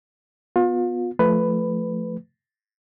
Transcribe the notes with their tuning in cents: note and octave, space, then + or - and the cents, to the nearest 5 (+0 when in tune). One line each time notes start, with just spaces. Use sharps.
B3 +0 F4 +35
F3 +0 A3 +0 B4 +10